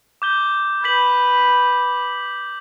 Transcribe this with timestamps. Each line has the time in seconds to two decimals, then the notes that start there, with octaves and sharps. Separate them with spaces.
0.22 D6 G6 G7
0.84 B4 G6 B6 F#7